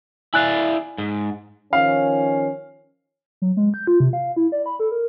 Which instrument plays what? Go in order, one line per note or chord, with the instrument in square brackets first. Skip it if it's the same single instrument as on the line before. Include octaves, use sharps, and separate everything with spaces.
[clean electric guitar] E4 D5 F5 [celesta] G#5 F#6
[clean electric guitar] G#2
[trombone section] D#3 F3 C#4 [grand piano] F5
[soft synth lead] F#3
G#3
G6
F4
C3
F5
E4
D5
B5
A4
A#4